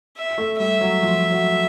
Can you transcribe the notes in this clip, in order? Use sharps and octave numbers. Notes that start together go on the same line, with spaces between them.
E5
A3
G3 E5
F#3
F3
F#3